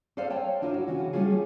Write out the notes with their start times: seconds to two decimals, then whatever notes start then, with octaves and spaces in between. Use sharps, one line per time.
0.17 A4 B4 C5 D5 F5
0.30 C#5 G5 A5
0.62 D4 E4 F4 A#4
0.74 F#4
0.87 C#3 E3 F4 F#4
1.13 G3 A3 C#4 F4 G#4